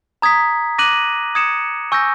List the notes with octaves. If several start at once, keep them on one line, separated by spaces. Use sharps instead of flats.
A#5 D#6 G#6 B6
D6 F#6 A#6 D#7 F#7
D#6 G#6 C#7 E7
G#5 C#6 E6 G6 A#6